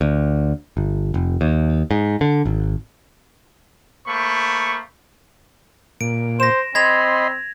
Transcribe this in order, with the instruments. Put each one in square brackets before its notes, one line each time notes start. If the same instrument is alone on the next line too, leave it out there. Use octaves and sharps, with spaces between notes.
[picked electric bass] D2
G1
F1
D#2
G#2
D3
G#1
[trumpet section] A3 A#3 C5 B5 C#6
[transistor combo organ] A#2 [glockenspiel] D7
[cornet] C5 [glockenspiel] A#6 E7
[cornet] C4 [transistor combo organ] D#5 B5 C6 [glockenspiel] G#6 A#6 F7